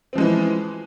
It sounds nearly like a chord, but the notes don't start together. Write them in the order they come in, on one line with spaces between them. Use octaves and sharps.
C4 F3 G#3 E3